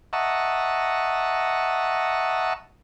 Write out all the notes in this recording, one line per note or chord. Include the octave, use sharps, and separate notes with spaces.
D#5 E5 F#5 A5 A#5 C#6